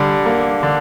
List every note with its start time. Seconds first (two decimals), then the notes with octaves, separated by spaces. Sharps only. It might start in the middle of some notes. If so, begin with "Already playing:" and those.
Already playing: D3 G3
0.26 A#3
0.63 D3